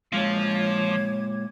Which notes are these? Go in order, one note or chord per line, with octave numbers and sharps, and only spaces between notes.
A#2 F3 G#3 C#5 F5 D6 G#6